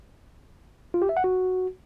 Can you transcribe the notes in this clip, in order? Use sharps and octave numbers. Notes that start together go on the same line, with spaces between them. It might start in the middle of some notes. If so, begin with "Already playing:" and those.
F4
G4
E5
F#5
F#4